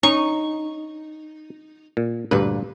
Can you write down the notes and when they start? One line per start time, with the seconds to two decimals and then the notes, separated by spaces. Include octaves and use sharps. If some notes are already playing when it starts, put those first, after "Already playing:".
0.03 C#4 D#4 C#6
1.97 A#2
2.31 D2 G2 A#2 B4